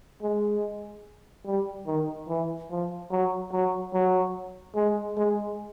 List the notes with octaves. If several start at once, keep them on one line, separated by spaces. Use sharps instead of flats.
G#3
G3
D#3
E3
F3
F#3
F#3
F#3
G#3
G#3